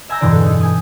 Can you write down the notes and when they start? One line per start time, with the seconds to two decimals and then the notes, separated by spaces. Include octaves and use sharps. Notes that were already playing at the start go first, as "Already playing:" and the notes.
0.09 E5 G#5 A#5 E6 G6 A#6
0.21 E2 G2 B2 D3 E3 D5
0.32 A4
0.45 D#4 E4
0.61 G5 G#5 D#6